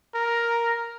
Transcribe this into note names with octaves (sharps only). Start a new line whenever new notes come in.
A#4